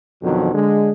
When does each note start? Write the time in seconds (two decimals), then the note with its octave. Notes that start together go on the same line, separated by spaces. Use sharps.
0.22 F2 B2 D3 D#3 F3 F#3
0.54 D3 G#3